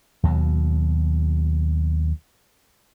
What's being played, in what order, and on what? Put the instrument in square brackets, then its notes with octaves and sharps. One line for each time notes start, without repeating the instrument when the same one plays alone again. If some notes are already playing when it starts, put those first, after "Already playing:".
[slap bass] D#2 B2 F#3